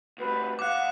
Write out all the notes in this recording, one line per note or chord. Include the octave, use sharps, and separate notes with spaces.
D2 G3 B4
D#2 F5 F#5 D6 F#6